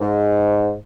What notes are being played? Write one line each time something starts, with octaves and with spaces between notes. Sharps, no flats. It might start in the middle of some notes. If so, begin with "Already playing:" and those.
G#2